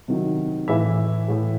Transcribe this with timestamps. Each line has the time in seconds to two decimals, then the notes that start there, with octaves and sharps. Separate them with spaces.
0.08 C3 D#3 F#3
0.68 A2 E3 E4 E5
1.28 A2 E3